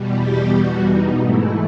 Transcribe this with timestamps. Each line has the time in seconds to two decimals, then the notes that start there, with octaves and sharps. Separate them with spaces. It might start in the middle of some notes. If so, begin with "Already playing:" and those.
Already playing: E2 B2 G3
0.22 G4
0.54 F#4
0.86 D#4
1.19 G#2 E3 A3 E4